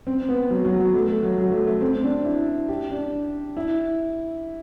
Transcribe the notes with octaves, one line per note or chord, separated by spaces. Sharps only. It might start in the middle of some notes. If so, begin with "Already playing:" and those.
C4
B3
F#3
F#3
F#3
A3
A3
F#3
F#3
A3
A3
C4
D4
E4
G4
D4
E4